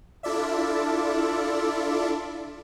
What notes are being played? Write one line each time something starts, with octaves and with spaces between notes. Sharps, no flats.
D4 E4 F4 A4 D5 E5